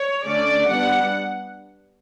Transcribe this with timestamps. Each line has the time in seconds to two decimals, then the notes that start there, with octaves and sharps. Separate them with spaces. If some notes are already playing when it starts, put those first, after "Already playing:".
Already playing: C#5
0.24 D3 A3 C#4 D5
0.67 G3 B3 D4 F#5